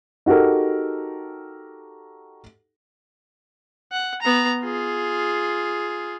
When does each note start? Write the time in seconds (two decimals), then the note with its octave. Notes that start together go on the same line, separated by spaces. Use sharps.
0.26 D#4 F#4 G4 A4 A#4
3.92 F#5
4.22 B3 A#5
4.62 F4 G#4